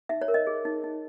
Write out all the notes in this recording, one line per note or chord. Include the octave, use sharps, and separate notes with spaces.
D#4 E5
C#5
A#4
D#5
G#4
D#4
D#4